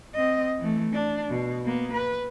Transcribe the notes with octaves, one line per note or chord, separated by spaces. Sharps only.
C4 D#5
E3 A3
D4
B2
A#3 B3
B4